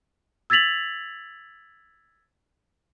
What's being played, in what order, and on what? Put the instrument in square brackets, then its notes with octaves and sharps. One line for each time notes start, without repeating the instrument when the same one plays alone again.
[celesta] E6 G#6 A6 B6 F7 F#7